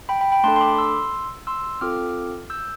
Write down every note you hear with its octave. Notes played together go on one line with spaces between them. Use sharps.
G5 B5
G5 B5
G5 B5
A3 D4 A4 A5 C6
C6
B5 D6
C6 E6
C6 E6
C4 F4 A4 D6 F6
E6 G6